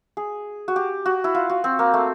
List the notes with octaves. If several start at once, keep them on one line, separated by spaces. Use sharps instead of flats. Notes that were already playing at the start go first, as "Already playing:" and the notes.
G#4
F#4
G4
F#4
E4
F4
F#4
C4
A#3
A3